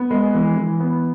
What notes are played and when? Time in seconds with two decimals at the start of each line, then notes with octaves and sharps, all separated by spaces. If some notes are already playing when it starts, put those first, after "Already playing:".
Already playing: B3
0.11 G#3
0.34 E3
0.56 E3
0.80 B3